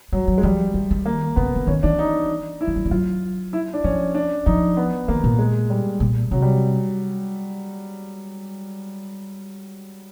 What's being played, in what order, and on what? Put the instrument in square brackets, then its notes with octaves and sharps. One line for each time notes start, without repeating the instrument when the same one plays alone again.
[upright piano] F#3 [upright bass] G3
[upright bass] F#3
[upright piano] G#3
[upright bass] F3 [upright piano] G3
[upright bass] E3
D#3
[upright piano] A#3
[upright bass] C#3 [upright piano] B3
[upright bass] D3
[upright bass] D#3 [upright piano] C#4
[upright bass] E3 [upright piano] D4
[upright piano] D#4
E4
[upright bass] F3
F#3
G3
[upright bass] F#3 [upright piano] F4
[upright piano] E4
D4
[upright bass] F3 [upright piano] C#4
[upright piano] D4
[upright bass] F3 [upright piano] D#4
[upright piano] B3
[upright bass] D#3 [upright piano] A#3
[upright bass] A#2
[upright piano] G#3
G3
[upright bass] A#2
[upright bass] C3 [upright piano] F#3
[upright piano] G3